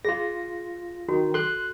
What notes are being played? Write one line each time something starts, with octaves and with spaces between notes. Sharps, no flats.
F4 G#4 A#6
D#3 F#4
A4 C6 F#6